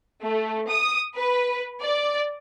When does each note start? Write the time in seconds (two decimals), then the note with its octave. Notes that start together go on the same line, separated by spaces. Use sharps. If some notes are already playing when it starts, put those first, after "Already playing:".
0.22 A3
0.69 D#6
1.16 B4
1.81 D5